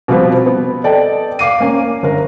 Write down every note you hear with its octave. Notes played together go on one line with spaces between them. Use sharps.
B2 F3 G3 C4 G4 B4
B3
A4 D5 D#5 G5 A5
F5 D6 C7 D#7
A#3 C#4
G1 A#4